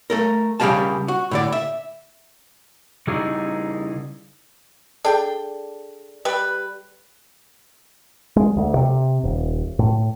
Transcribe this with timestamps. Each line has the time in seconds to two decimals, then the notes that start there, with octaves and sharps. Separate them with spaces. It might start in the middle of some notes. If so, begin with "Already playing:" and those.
0.10 A3 A4 A#4
0.60 C#3 G3 G4 G#4 F5 A5
1.08 F#4
1.31 A2 D3 D5
1.52 E5
3.07 C#3 G3 D#4 E4 G#4
5.04 D4 G#4 A4 G5
6.25 G3 B4
8.36 G#3
8.57 D2
8.75 C3
9.24 D#1
9.79 A2